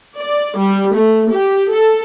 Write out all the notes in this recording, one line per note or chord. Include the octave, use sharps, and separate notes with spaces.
D5
G3
A3
G4
A4